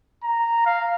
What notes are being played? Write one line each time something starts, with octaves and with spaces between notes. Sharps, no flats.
A#5
F5